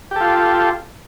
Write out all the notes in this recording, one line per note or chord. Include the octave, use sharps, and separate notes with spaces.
F4 G4 A4